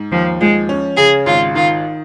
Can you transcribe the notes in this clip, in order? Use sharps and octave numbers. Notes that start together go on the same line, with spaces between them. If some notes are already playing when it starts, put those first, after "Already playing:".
Already playing: G#2
D#2 F3
F3 G#3
C#4
C#3 G#4
G#1 F4
D#3 F4